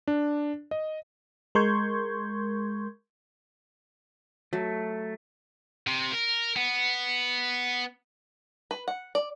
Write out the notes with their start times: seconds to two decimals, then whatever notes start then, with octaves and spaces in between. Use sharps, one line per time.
0.08 D4
0.71 D#5
1.55 G#3 A#4 C6 C#6 G6 G#6
4.53 F#3 A3
5.87 C3
6.12 A#4
6.56 B3
8.71 B4
8.88 F#5
9.15 D5